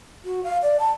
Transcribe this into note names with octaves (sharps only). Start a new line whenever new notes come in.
F#4
F5
D5
A5